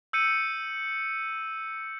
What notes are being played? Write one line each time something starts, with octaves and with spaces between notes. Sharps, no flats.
E6 G6 C#7 D#7